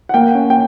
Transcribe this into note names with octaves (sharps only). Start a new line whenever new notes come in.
F#5
A#3 G5
C#4
G5